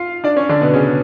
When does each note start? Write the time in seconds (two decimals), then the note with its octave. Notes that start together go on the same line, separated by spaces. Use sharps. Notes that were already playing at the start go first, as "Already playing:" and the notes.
Already playing: F4 F5
0.24 D4 D5
0.36 C#4 C#5
0.49 D3 D4
0.61 B2 B3
0.74 C#3 C#4